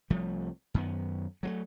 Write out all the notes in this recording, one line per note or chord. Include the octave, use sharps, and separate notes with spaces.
C2 F3 G3 A3
F#2 D#3 B3
F#3 G3 A3